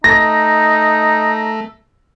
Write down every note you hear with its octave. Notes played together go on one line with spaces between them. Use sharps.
A3 D#4 A#5 A#6